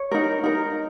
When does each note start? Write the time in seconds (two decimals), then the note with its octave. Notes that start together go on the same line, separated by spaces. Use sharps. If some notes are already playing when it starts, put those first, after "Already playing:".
Already playing: C#5
0.11 D#4 A#4
0.44 D#4 A#4